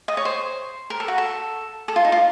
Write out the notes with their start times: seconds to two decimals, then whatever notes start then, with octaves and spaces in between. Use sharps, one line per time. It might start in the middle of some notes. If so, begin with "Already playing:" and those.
0.08 D#5
0.17 C#5
0.25 C5
0.90 A#4
1.00 A4
1.08 F#4
1.18 A4
1.88 A4
1.96 F4
2.05 D#4
2.12 F4